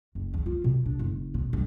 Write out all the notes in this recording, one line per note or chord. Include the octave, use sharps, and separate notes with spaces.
F#1
E2
F4
B2
D4
F#1
B2
G2